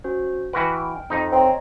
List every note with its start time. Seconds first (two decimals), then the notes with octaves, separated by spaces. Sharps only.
0.04 C#4 F#4 C5
0.53 E3 F#4 B4 G5 F6 D7
1.10 F2 D#4
1.32 C4 C#5 D#5 A#5